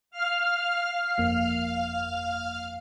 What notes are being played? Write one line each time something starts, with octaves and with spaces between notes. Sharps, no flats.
F5 F6
G1 F2 A#3